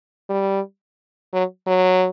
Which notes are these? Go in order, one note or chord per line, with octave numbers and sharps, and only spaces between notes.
G3
F#3
F#3